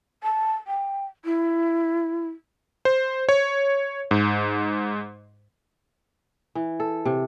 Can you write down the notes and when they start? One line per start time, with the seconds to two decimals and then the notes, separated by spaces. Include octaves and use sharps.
0.23 A5
0.67 G5
1.25 E4
2.85 C5
3.29 C#5
4.11 G#2
6.55 E3
6.80 A4
7.05 C3